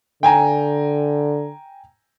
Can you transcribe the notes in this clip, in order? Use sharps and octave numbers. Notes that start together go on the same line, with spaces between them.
D3 G5 G#5 A#5